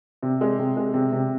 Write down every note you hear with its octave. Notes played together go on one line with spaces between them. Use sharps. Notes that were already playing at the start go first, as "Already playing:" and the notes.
C3
G#3
C3
G#3
C3
C3